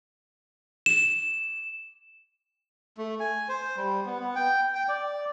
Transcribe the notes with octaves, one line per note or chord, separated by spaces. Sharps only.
E7
A3
G#5
C5
G3
B3
B3
G5
G5
D5